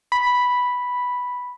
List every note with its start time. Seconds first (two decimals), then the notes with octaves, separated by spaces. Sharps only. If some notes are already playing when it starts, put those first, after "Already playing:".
0.12 B5